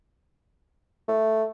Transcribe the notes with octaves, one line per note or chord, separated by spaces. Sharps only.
A3